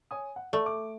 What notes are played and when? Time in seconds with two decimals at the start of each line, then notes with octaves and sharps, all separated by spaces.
0.11 C#5 G#5 D#6
0.36 F#5
0.53 A3 D5
0.66 D6